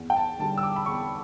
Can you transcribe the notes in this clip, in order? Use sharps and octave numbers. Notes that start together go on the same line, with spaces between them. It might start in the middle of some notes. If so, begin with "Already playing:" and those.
Already playing: E2
G5
A5
D3 G3 A5
E6
D6
B5
E2 C#6